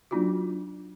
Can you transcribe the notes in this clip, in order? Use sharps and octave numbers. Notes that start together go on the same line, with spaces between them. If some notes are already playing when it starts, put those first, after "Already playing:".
F#3 A#3 D4 D#4 F4 F#4